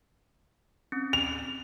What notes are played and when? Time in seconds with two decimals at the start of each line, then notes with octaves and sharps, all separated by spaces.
0.92 C4 C#4
1.13 F7